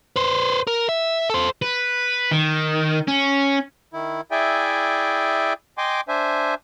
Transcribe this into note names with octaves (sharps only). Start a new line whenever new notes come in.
B4 C5
A#4
E5
A4 C5
B4
D#3
C#4
D#3 E4
E4 G#4 D5 E5 G5 G#5
D#5 G5 G#5 C6 D6
D4 C5 E5 G#5